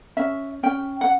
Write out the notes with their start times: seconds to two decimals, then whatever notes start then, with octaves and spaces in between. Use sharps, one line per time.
0.17 C#4 E5
0.63 C#4 G5
1.01 F#5